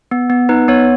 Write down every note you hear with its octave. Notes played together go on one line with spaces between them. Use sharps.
B3
B3
D#4 B4
B3 C#5